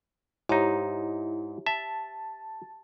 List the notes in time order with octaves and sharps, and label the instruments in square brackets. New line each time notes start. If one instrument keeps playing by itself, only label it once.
[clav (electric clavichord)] G#2 D#4 [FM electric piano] E4 [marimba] G4 C#5 A#5
[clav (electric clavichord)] E5 [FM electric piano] A5